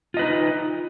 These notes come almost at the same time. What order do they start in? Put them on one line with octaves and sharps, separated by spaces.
F4 D#5 B4 D#4